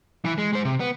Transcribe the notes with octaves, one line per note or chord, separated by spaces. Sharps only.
E3 E4
G#3
G#3 C5
C3
B3